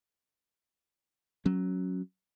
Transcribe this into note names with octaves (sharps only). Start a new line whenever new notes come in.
F#3 C#4